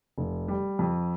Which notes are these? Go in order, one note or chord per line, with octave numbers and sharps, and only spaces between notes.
F1
G3
F2